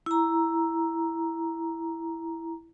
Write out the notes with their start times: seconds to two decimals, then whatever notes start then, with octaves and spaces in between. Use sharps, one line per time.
0.06 E4 A#5